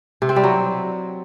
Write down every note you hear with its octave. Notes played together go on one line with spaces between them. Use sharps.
C3
C4
G3
F#3